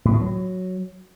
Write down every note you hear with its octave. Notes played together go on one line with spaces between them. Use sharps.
A2
E3
F#3